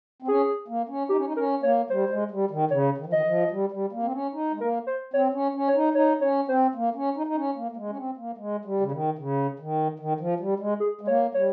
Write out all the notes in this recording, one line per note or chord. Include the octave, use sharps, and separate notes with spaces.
C4
C#4 G#4
A#3
C#4
D#4 G4
C#4
D#4
C#4 A#4
A#3 C#5
G3 C5
G#3
G3
D#3
C#3 C#5
D#3
F3
D#3 D#5
F3
G3
G3
A#3
C4
C#4
D#4
G#3
A#3 A#4
C5
C4 C#5
C#4
C#4
C#5
D#4
D#4 C#5
C#4 C#5
C4 C5
A#3
C#4
D#4
D#4
C#4
A#3
A#3
G#3
C#4
C4
A#3
G#3
G3
C#3
D#3
C#3
D#3
D#3
F3
G3
G#3
G#4
G#3
A#3 C#5
G3 C#5